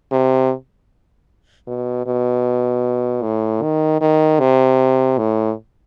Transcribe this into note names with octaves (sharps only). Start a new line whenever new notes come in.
C3
B2
B2
A2
D#3
D#3
C3
A2